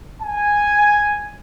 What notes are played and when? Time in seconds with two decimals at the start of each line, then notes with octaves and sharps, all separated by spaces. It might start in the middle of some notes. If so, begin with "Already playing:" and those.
0.22 G#5